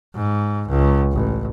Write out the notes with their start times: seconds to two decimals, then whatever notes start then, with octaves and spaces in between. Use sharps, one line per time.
0.15 G#2
0.69 C#2
1.12 A1